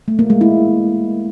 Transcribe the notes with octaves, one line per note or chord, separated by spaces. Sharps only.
A3
A#3
G#3
E4